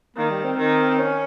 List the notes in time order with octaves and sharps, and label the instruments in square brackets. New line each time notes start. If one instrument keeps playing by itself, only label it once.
[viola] D#3 [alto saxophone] A#3
[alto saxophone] G3
C4
[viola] D#3
[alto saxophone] C#4